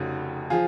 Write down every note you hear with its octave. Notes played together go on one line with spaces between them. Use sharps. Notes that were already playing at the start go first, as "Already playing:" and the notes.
Already playing: F1 F2 C#3 D#4 F#4
F3 F4 G#4